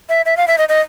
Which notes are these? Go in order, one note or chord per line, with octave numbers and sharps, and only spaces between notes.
E5
E5
F5
E5
D#5
D#5